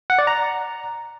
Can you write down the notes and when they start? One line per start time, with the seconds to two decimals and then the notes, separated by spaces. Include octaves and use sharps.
0.10 F#5
0.19 D5
0.27 A#5